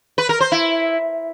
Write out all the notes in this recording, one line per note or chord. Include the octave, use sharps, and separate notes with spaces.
B4
A#4
C5
E4